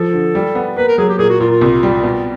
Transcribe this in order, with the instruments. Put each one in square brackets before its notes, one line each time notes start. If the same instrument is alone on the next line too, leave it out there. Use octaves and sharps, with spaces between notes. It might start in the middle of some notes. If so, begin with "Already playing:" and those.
Already playing: [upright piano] F3 [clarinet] A4
[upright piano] D3
G3
B3
[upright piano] A#3 [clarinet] B4
[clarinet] A#4
[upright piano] F#3 [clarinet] G#4
[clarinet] G4
[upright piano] A#2 [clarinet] G#4
[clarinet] F#4
[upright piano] A#2 [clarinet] F4
[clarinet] F4
[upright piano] C2
G3
B2